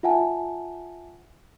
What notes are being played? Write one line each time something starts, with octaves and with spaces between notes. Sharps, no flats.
F4 E5 F#5 G#5 A5